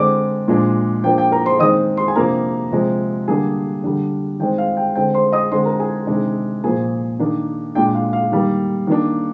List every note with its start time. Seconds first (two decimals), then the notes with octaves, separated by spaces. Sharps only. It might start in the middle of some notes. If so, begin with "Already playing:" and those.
Already playing: D3 G#3 C4 D5 D6
0.48 A#2 F3 G#3 D4
1.03 F3 A#3 D4 G5
1.18 G5
1.32 A#4 A#5
1.45 C5 C6
1.59 D#3 G#3 C4 D#5 D#6
1.97 C5 C6
2.08 G#5
2.16 C3 F3 A#3 D4 A#4 A#5
2.72 C3 F3 G#3
3.28 D3 G3 A#3 D4 G#4 G#5
3.84 D3 G3 D4
4.40 D#3 G#3 C4 G5
4.58 F5
4.77 G5
4.95 D3 G#3 C4 G5
5.14 C5 C6
5.32 D#5 D#6
5.52 D3 G#3 C4 C5 C6
5.65 A#4 A#5
5.80 G#4 G#5
6.07 C3 D#3 G#3 D4
6.64 A#2 F3 A#3 G#4 G#5
7.19 D#3 A#3 D4
7.75 A#2 G#3 D4 G5
7.95 F5
8.13 F5
8.32 D#3 G3 A#3
8.87 D#3 A#3 D4